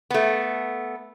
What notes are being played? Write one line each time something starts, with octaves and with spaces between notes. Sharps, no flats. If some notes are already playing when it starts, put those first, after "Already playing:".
A3 B3